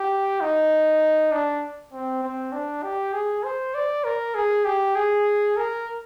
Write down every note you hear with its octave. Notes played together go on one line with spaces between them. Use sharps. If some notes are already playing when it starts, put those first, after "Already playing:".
Already playing: G4
D#4
D4
C4
C4
D4
G4
G#4
C5
D5
A#4
G#4
G4
G#4
A#4